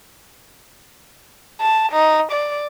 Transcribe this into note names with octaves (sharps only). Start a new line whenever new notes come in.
A5
D#4
D5